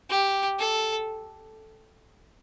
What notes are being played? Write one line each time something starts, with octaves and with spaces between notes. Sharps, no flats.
G4
A4